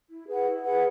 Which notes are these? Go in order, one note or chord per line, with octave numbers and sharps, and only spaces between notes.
E4
G#4 B4 F#5
E4
G#4 B4 F#5